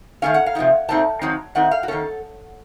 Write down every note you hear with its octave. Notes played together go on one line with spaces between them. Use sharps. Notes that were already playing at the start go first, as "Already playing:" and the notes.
D#3 A3 C#4 F5
F#5
F5
C3 F3 A3 D#4
A#2 A3 C4 D#4 A5
F2 D#3 F#3 C4 D#4
D#3 A3 C4 D#4 F#5
F5
F#4
D#3 A#3 C#4 A4